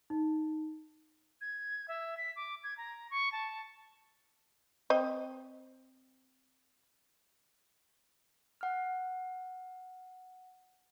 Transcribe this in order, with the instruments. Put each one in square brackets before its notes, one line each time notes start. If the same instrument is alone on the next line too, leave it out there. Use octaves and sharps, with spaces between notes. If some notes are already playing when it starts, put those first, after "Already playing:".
[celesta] D#4
[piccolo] G#6
E5
B6
D6
G#6
A#5
C#6
A5
[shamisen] C4 D#5
[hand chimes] F#5 F6